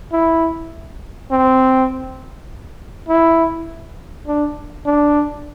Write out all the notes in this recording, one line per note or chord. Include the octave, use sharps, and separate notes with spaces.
E4
C4
E4
D4
D4